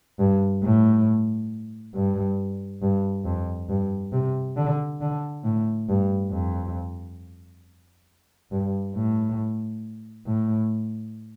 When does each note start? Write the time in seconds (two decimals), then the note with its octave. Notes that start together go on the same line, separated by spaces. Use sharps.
0.19 G2
0.63 A2
1.94 G2
2.82 G2
3.26 F2
3.69 G2
4.12 C3
4.57 D3
5.01 D3
5.44 A2
5.89 G2
6.32 F2
8.52 G2
8.95 A2
10.26 A2